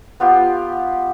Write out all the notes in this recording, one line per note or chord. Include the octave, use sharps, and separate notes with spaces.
B3 F4 G4